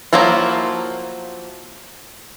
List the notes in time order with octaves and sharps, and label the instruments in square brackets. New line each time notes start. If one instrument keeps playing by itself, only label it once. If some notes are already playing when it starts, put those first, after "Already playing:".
[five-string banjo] F3 F#3 A#3 E4 F4